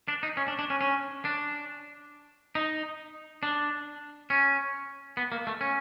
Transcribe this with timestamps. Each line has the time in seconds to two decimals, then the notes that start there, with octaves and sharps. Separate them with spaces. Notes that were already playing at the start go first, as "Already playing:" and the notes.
0.08 D4
0.23 D#4
0.37 C#4
0.48 D4
0.59 D4
0.70 C#4
0.81 C#4
1.25 D4
2.55 D#4
3.43 D4
4.30 C#4
5.17 B3
5.32 A#3
5.47 A3
5.61 C#4